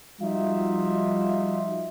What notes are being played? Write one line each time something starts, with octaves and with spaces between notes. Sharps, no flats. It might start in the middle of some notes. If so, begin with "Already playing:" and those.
F3 G3 D#4 F4 F#4 E5